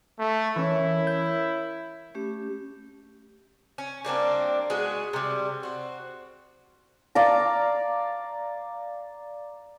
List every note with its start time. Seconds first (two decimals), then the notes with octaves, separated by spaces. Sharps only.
0.19 A3
0.56 E3 C#4 E4 A#4 C#5
1.07 G6
2.15 A3 C#4 G4
3.78 C#4
4.05 G3 A#3 C4 D4
4.70 G#3 B3 F#4 G#4
5.13 C3 G3
5.63 C4 F#4
7.15 D5 F5 A#5